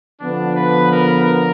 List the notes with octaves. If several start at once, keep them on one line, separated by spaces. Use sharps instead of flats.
D3 F3 B3 D4
B4
A#4